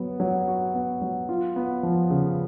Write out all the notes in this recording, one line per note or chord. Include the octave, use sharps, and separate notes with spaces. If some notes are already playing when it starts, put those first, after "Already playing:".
Already playing: F#3 B3
F#3
F#4
B3
F#3
F4
B3
F3
C#3